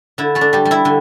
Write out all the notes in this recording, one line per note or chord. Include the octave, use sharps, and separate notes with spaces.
D3 E4
A3 A4
D4
G3 G4
G3
E4 E5
D3